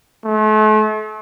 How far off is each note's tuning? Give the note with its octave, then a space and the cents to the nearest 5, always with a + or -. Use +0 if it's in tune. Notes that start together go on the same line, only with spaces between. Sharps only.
A3 -40